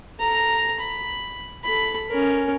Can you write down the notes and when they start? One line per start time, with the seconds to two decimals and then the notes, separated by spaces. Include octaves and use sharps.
0.19 A4 A#5
0.80 B5
1.64 A4 B5
2.09 C#4 A#4